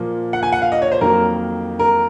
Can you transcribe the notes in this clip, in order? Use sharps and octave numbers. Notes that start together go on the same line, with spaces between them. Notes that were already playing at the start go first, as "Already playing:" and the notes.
Already playing: A#2 F3 A#3
F#5
G#5
F#5
F5
D#5
C#5
C5
F2 D#3 F#3 A#3 A#4
A#4